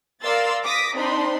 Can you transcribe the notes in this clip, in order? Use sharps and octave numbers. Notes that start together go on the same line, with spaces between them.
A#4 D5 F5 C6 E6 A6
D6 D#6 A#6 B6
C4 D4 D#4 C5 B5 C6